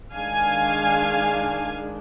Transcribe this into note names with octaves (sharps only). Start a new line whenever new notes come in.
D#3 G#3 D4 F5 G#5